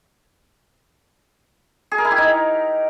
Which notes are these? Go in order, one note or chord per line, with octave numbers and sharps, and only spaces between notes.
G#4
A#4
E4
G4
D#4